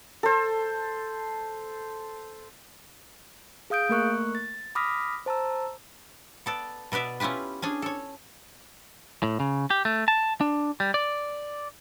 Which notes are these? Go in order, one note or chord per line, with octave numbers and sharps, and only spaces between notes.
A4 C5
G#4 F5 D#6 G6 D7
A3 A#3 A#4 C#6 F#6
A6
B5 D6 D#6 F6 A#6 B6
C5 A5 A#5 E6
B3 A4 D5
B2 B3 B4 D5 E5
C#4 E4 F4 G4 B4
C#4 D4 G#4
A4 C#5
A2
C#3
G4
A3
A5
D4
G3
D5